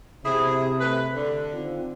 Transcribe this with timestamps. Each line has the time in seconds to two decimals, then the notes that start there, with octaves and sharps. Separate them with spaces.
0.25 C3 E4 G#4
0.81 A3 B4
1.15 D3
1.53 D#3 C4 F4